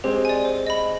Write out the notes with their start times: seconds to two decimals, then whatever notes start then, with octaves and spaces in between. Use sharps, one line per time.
0.04 G#3 C4 G4
0.25 D5 G#5
0.45 C5
0.67 D#5 B5